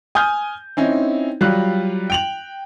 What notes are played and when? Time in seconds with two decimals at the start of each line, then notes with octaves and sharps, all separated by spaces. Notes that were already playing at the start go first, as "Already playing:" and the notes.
0.15 G#5 D#6 F6 G6
0.77 C4 C#4 D#4 E4
1.41 F#3 G3 F4 F5 F#6
2.10 G5 F7 F#7